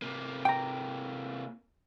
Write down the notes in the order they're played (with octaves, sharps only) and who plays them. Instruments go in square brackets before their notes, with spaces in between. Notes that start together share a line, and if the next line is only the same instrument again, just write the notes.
[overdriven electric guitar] C3 A#3
[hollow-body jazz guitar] G5 A#5